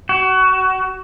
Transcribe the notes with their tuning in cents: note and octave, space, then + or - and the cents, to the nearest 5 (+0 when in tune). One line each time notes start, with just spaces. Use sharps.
F#4 +25